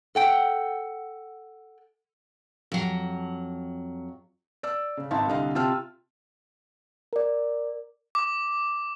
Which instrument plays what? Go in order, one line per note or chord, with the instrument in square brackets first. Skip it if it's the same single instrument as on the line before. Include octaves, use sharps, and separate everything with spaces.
[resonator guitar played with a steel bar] A4 F#5 G5
[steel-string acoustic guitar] F2 F#3
[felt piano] D5 E6
C#3
G#1 D#4 E5 F5 A5
C2 D3 D#5 F5
C3 F4 A5 E6 F6
[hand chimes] A#4 D5
[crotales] D6